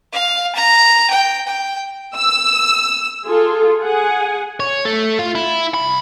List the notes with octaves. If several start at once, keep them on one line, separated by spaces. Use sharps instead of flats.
F5
A#5
G5
G5
E6
F4 G#4 A4
G#4 F#5 G#5
C#5
A3
F4
E4
C2 B5